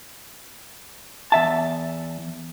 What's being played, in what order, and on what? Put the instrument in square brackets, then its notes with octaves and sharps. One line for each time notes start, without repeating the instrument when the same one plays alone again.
[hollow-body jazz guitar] E2 E5 A5